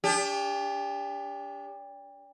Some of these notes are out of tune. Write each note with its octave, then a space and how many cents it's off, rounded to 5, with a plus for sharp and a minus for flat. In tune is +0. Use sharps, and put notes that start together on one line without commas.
D4 -35 G4 +30